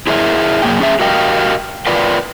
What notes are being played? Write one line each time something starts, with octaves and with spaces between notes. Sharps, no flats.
E4 G#4 A#4 C5 E5
F#2 A#2 A#3 G#4 G5
C#4 G#4 E5
F#4 G4 A#4 D#5 F5 G5
F4 A#4 B4 D5 G5